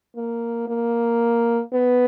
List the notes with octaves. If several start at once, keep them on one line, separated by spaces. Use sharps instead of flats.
A#3
A#3
B3